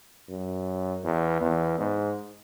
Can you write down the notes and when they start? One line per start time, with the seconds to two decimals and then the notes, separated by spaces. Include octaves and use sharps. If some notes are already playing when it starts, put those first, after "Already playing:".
0.29 F#2
1.04 E2
1.41 E2
1.79 G#2